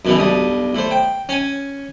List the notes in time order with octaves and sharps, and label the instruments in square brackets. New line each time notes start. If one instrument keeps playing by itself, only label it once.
[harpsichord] F#2 B2 E3
B1 G2 D#6
A2 C5
G5
C#4 G#5